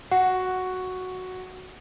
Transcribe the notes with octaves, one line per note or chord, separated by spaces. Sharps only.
F#4 F#5